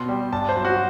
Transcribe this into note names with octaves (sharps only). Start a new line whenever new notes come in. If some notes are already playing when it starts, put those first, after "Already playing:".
Already playing: B2 C6
G3
G2 A5
C5
F#3
F#4